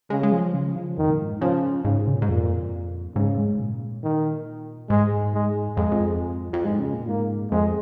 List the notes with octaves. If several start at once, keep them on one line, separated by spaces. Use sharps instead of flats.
C#3 G#3
G#3
F3
C#3
F3
F2 D#3
A#2
G#2
C#3 F3
G#2 C#3
C#3
A#2
G#2
F2 A#2
G#2 C#3
G#3
A#2
D#3
G#2 G#3
G#3
F2 G#3
F2
F2
G#2 G#3
C#3
A#2
G#2 A#3
F2 G#3